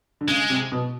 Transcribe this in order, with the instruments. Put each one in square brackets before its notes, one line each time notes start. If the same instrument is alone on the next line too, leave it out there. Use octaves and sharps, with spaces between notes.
[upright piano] D3
[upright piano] C#3 [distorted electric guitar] G#3
[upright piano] C3
B2